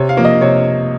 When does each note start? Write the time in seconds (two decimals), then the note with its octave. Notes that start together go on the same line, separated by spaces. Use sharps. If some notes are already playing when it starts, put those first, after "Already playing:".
Already playing: C3 C#5
0.09 F5
0.17 F3 A#3
0.25 D#5
0.41 C3 C#5